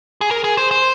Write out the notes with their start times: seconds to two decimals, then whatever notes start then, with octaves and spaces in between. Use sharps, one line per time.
0.21 G#4
0.31 A#4
0.44 G#4
0.57 C5
0.71 C5